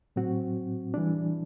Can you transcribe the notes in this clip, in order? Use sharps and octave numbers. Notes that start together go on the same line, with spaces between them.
A2 F#3 C4 F#4
E3 G3 D4